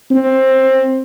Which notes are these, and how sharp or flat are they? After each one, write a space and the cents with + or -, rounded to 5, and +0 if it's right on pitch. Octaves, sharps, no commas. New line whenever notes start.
C4 +15